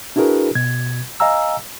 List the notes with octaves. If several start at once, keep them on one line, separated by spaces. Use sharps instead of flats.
D4 E4 F#4 G#4 A#4 B4
B2 G#6
D#5 F5 G#5 A#5 E6